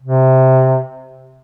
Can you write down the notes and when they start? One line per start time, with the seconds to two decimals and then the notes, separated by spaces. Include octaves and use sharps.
0.02 C3